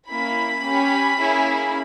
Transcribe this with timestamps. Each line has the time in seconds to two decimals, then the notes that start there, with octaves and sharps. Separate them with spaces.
0.09 A#3 C#4 E4 B5
0.63 C#4 G4
1.18 A#3 C#4 E4 G#4